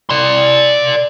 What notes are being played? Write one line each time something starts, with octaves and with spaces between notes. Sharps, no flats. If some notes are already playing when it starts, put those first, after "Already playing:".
D5 C6